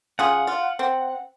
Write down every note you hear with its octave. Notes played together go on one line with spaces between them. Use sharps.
C#3 F4 G#4 F#5
F4
C4